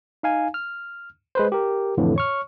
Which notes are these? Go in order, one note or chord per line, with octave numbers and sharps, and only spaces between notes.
D#4 F5 G#5
F6
G#3 B4 C5
G4 A#4
F2 A2 D3 E3
C#5 C#6 F6